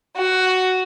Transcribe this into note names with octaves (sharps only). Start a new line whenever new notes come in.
F#4